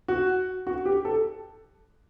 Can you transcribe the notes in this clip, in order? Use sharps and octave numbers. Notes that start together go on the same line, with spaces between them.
F#4
F#4
G4
A4